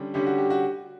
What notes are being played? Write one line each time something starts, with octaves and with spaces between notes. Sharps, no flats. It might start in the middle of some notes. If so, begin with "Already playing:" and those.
Already playing: D3 G3 C#4
D3 G3 C#4 G4
F#4
G4
F#4